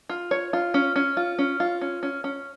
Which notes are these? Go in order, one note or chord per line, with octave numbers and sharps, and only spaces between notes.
F4
C#5
F4
C#4
C#4
F4
C#4
F4
C#4
C#4
C#4